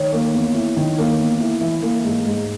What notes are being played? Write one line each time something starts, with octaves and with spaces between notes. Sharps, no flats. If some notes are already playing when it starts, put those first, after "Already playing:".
Already playing: D#3 C#5
A#3
E2
E4
D#3
A#3
E2
E4
E3
A#3
G#2
G#2